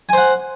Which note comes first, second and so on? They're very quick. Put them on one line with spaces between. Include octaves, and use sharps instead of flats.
G#5 C5 F#5